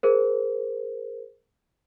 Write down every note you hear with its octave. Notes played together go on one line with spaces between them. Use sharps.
G#4 A#4 C5